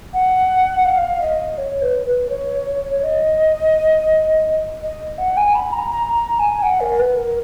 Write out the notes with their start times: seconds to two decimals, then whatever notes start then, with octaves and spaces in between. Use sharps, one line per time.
0.13 F#5
0.85 F5
1.21 D#5
1.57 C#5
1.81 B4
2.06 B4
2.29 C#5
3.02 D#5
4.82 D#5
5.18 F#5
5.37 G#5
5.54 B5
5.72 A#5
5.91 A#5
6.14 A#5
6.39 G#5
6.62 F#5
6.80 A#4
6.99 B4
7.17 A#4